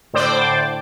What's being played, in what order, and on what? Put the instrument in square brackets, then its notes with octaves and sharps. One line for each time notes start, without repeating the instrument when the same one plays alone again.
[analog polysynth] A2 D3 C5 D5 G5 D6